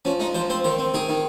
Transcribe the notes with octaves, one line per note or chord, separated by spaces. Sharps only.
F3 C#4
G#3 D#4
F3 C5
C4 C5
D#3 C5
C4
D#3 G#4
D#3